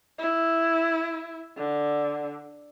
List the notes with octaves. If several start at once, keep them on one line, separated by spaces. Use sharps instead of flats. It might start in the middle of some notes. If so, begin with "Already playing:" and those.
E4
D3